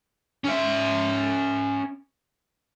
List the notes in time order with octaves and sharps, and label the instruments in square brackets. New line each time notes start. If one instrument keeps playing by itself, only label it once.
[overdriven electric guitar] C#4 E5